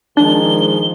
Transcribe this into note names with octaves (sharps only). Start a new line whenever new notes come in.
D#3 F3 G#3 D4 G7